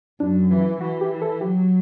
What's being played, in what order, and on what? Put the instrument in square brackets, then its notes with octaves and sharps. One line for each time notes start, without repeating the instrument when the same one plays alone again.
[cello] F#2 [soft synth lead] D4
[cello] E3
[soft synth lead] E4
[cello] E3 [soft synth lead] F#4
[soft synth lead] G4
A4
[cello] F#3 [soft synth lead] G4